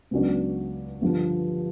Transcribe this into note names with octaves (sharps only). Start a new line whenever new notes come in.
C#2 C#3 F#3 B3 D4
G2 D3 F3